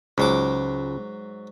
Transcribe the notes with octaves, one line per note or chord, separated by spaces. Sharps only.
C#2 G#2 F#3 D6